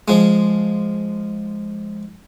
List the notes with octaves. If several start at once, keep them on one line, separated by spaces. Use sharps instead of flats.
F3 G#3